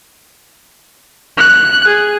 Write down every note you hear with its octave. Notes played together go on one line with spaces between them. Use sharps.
F#6
G#4